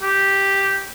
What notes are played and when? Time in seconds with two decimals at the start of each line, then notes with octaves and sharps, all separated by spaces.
0.02 G4